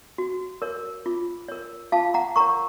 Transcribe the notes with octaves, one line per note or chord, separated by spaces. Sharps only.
F#4
A#4 C#5
F4
A#4 C#5
F4 F5 A5
F#5 A#5
A#4 C#5 A#5 C#6